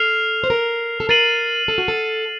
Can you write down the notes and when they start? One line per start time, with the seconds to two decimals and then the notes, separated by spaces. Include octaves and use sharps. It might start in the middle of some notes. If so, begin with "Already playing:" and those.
Already playing: A4 F6 C7 F7
0.44 C5
0.50 A#4
1.00 A4
1.09 A#4 A6 C7 D#7 F#7
1.68 A4
1.78 F#4
1.88 A4